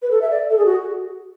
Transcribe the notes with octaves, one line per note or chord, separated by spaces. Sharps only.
B4
A4
E5
D5
A4
G#4
F#4